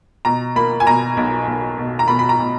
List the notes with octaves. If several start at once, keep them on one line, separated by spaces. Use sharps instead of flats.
B2 A#5
A#3 B5
G#5
B2 A#5
B1
B1
B2
A#5
B2 B5
B5
A#5
B2